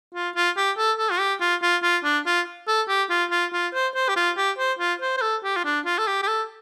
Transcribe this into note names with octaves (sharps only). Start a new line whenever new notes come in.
F4
F4
G4
A4
A4
F4
G4
F4
F4
F4
D4
F4
A4
G4
F4
F4
F4
C5
C5
G4
F4
G4
C5
F4
C5
C5
A4
G4
F4
D4
F4
A4
G4
G4
A4